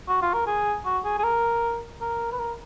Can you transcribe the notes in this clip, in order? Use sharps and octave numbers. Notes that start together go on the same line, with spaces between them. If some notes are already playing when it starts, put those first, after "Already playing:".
F#4
F4
A#4
G#4
F#4
G#4
G#4
A#4
A#4
B4
A#4